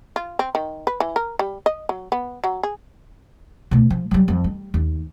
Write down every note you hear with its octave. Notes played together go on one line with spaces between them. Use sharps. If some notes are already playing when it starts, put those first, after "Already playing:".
F4
C4
D#3
B4
E3
A#4
G3
D#5
F#3
B3
F#3
G#4
D2 B2
F3
F#3 G3
F2
G3
D#2